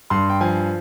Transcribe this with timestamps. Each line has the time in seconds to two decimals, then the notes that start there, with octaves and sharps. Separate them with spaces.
0.10 G2 C6
0.30 G5
0.41 F3 G#5